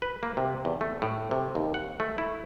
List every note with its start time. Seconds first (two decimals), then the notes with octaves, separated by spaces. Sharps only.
0.02 B4
0.23 A#3
0.37 C3
0.65 E2
0.81 A3
1.02 A2
1.31 C3
1.55 D#2
1.74 F#5
2.00 A3
2.18 E4